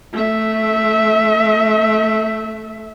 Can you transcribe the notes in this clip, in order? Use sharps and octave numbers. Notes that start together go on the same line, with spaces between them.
A3 E5